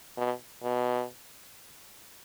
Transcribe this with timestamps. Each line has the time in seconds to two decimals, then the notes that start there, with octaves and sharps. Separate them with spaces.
0.18 B2
0.63 B2